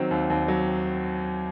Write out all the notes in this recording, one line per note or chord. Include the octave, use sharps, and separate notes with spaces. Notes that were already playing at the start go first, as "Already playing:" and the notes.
Already playing: D#3 F#3 C4
D#2
D#2
F#3